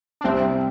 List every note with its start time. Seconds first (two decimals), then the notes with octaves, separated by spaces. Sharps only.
0.21 D4
0.24 C2 C4